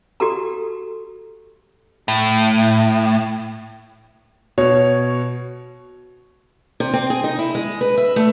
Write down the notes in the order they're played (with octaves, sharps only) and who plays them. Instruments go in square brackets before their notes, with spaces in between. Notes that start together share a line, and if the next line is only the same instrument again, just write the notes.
[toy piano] F#4 G4 A4 A#5
[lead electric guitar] A2
[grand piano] B2 C#5
[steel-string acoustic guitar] C3
C4
G#4
D#4
E4
G#3
B4
E5
A3